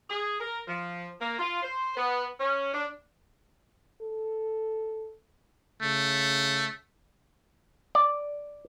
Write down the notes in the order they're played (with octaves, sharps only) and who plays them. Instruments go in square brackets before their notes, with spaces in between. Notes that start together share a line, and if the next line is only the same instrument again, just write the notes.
[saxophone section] G#4
A#4
F3
A#3
F4
C5
B3
C#4
D4
[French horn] A4
[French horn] C#3 [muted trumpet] A3
[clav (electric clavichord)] D5